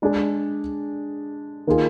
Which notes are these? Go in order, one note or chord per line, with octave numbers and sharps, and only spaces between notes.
G#3 D4 G#4
D#3 A#3 F4 G#4